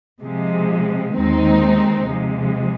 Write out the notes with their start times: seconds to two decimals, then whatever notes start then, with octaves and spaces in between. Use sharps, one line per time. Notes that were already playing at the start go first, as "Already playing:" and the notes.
0.23 C3 F3 G#3
1.17 D#2 D#3 G#3 C4 D#4
2.09 C3 F3 G#3